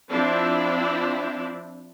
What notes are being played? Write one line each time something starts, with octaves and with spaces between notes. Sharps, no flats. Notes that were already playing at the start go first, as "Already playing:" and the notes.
F3 C4 D4 E4